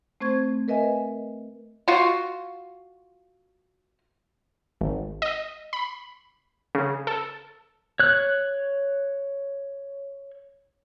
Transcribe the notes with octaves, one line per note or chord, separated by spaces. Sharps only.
A3 C4 C5 C#6 G#6
A#4 B4 D#5 E5 G#5
F4 F#4
G#1
D#5
B5
C#3
A4
C#5 F#6